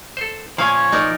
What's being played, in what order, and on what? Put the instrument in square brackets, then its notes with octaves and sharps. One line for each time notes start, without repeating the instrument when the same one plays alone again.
[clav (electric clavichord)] A4 C5
[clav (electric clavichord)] A#2 [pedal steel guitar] F3 G#5 [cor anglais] C#5 [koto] F5
[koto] D#4 A#4 D5